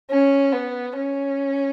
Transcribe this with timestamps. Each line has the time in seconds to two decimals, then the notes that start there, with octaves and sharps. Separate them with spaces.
0.10 C#4
0.52 B3
0.96 C#4